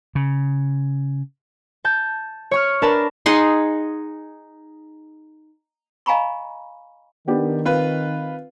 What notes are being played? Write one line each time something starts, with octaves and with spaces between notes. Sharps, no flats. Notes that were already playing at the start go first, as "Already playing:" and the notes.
C#3
A5 G6
C#5 C#6 F6
D4 A#4 B4 A5 B5
D#4 G#4 F#5 C6
D#5 F5 G#5 A#5 B5 C#6
D#3 B3 D4 G4
C4 F4 B4